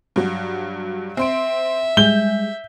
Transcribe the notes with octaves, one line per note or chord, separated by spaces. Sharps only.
G2 F#3
C4 E5 C6 D7
G3 G#3 G6 G7